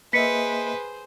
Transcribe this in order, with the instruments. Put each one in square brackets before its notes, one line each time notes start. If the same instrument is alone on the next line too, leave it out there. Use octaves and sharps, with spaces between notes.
[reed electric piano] A#3 D#5 E5 [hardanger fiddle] G#4 C5 [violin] B4 [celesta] B6 C#7